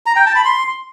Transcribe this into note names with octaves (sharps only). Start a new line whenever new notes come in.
A#5
G5
A5
B5
C6